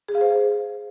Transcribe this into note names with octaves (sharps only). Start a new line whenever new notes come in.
G#4
F5
C5